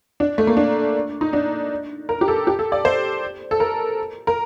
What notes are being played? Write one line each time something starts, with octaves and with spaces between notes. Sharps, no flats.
D4
A3
A#3
D4
D#4
D4
A#4
G4
A4
G4
A4
D5
C5
A4
A#4
A#4